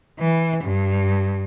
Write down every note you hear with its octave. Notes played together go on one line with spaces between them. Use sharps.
E3
G2